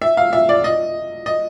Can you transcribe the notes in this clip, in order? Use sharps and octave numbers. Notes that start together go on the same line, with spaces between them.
E5
F5
E5
D5
D#5
D#5